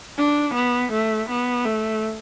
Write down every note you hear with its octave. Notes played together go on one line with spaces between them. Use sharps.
D4
B3
A3
B3
A3